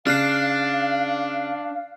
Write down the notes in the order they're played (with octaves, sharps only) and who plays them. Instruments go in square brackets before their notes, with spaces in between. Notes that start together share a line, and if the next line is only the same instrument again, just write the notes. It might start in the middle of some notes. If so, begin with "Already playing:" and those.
[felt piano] C#3 [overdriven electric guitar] D4 [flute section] F5 [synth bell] F6 F#6 C7